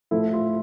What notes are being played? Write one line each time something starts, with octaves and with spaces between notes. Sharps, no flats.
A2 F3 A3 E4
F4